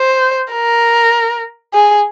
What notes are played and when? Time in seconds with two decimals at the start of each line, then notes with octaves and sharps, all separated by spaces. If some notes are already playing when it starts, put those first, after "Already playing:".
Already playing: C5
0.52 A#4
1.74 G#4